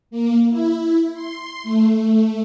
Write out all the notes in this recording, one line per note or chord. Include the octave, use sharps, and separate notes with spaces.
A#3
E4
C6
A3